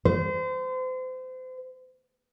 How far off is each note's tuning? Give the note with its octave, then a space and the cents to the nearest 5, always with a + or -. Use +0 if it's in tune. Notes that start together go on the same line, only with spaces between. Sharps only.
C5 -35